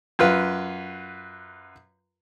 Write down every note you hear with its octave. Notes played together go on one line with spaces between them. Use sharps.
F#2 F4 B4